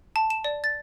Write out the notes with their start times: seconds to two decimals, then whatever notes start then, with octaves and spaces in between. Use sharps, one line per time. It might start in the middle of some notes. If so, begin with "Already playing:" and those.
0.16 A5
0.30 E7
0.44 D5
0.64 A6